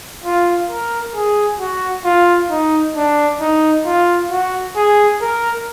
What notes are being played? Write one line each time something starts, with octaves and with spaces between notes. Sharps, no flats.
F4
A#4
G#4
F#4
F4
D#4
D4
D#4
F4
F#4
G#4
A#4